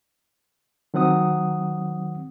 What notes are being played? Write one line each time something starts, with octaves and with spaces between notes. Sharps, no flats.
D#3 F#3 C4 F#5 D#6